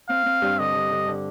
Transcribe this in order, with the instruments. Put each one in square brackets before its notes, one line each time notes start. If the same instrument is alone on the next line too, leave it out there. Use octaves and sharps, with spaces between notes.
[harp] C4 [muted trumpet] F5
[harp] C4
G2
[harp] D3 [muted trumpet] D#5
[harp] D3
D3
D3